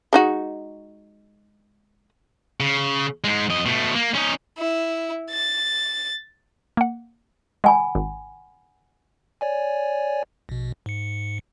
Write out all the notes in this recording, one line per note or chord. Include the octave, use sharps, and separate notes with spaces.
G#3 D#4 F#4
C#3
G#2 G#3
F2 D#5
B2 A3
A#3
C#4 D#4
E4
A6
A#3 F#5
G#3 F#5 G#5 B5
G#1
C#5 D5 G#5
A#1 B2
G#2 C#7